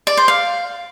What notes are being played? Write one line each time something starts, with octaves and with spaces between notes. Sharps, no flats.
D5
C5
F5